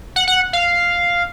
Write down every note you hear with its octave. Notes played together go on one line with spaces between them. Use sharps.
F#5
F#5
F5